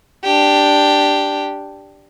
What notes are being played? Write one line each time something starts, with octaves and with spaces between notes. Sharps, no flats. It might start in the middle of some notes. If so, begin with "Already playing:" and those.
D4 G4